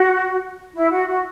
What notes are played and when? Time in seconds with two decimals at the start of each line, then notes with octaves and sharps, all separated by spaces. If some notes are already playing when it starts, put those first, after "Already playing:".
Already playing: F#4
0.74 E4
0.92 F#4
1.07 F#4